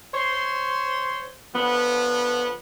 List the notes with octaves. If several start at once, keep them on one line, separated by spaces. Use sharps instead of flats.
C5 C#5 C6
D3 F3 B3